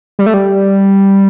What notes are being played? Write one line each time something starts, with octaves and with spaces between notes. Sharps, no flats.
G3
A3
G3